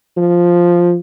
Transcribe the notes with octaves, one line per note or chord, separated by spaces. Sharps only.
F3